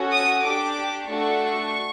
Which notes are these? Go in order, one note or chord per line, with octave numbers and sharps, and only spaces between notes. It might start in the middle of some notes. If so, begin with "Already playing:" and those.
Already playing: C#4 F#4 A4
D#6
D4 G4 D6
A3 D4 F#4 A4 C#6